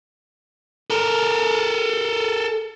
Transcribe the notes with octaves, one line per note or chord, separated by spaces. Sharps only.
A4 A#4